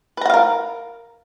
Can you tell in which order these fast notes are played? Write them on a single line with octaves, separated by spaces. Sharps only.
B4 A#5 F#5 F5 A#4